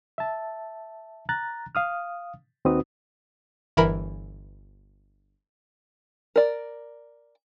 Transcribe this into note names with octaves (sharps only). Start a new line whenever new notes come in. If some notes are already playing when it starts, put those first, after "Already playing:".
E5 A5
A#5 F#6 A6
F5 D#6 F6
D#2 C4 D#4 F#4 B4 D#6
G1 E3 E4 A#4 B5
A#4 D5